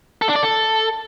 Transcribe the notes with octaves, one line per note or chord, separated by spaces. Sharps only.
A4
D4
D5
A4